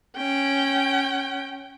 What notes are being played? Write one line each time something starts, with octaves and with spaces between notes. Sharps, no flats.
C#4 G5